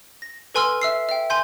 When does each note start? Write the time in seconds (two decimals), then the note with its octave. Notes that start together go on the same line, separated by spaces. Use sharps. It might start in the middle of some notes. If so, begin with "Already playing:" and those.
0.22 A#6
0.54 A4 B4 G#5 C6 E6 F6
0.82 E5 E6 C7
1.09 E5 G5
1.30 G#5 C6 G6